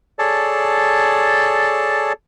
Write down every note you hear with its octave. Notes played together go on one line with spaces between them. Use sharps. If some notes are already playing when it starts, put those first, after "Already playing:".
G#4 A4 C#5 D5 A5